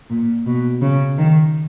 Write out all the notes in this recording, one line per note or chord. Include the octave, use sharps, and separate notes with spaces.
A#2
B2
C#3
D#3